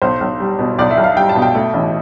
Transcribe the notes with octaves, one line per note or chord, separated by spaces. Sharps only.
B1 C5
B1
G3
B2
B1 D5
E5
B1
F5
G3 G5
A5
B2
G5
A3
A1